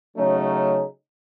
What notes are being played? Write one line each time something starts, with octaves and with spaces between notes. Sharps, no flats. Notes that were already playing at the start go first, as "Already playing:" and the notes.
C#3 F#3 A3 C#4 D#4